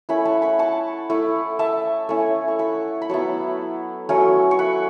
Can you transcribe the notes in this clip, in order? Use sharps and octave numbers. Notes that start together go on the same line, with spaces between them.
A3 C#4 E4 F#5 B5
A5 C#6
F#5 B5
A5 C#6
A3 E4
E5 A5
A3 C#4 E4
C#6
F#5 B5
B5
F#3 B3 E4 A5 C#6
F#3 A3 C#4
C#6
F#5 B5